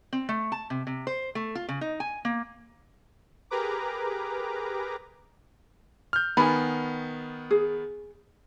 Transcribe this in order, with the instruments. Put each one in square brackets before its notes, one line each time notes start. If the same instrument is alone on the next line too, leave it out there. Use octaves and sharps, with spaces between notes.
[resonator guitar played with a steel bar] C4
A3
A5
C3
C3
C5
A3
F4
C#3
D#4
G#5
A#3
[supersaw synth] G4 G#4 A#4 B4 A#5 D6
[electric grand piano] F6 G6
[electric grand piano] D#3 B3 [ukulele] G#5 B5
[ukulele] G#4